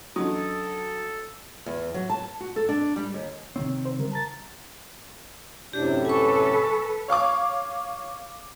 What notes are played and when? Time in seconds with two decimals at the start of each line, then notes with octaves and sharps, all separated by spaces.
0.16 E3 F#3 C#4 D4 A4 D#6
1.66 E2
1.94 F#3
2.10 A5
2.40 F#4
2.56 A4
2.69 D4
2.96 G3
3.14 D#2
3.56 C3 D#3 C4 C#5
3.85 C5
3.98 C#3 G3 A#4
4.12 A5 A#5 A6
5.73 F#2 A2 C3 D4 G4
6.05 A4 B4 G#5 C#6
7.08 C#5 F5 C#6 D6